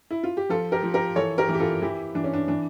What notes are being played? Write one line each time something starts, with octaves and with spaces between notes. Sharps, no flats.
E4
F4
G4
F3 F4 A4
G4 A#4
F3
G4 A#4
E3 A4 C#5
G4 A#4
E3
G4
F4 A4
E3 E4 G4
E3 D4
C#4
D4
E3 D4